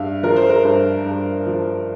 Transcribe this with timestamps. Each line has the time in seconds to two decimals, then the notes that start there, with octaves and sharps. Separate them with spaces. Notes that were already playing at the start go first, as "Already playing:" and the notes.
Already playing: G2 E5 F5
0.23 F3 A#4
0.36 C5
0.49 A#4
0.63 G2 C5
1.05 G2
1.46 F3